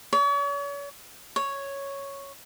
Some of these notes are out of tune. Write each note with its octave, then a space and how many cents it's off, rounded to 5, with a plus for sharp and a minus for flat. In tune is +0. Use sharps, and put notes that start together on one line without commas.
C#5 +40
C#5 +0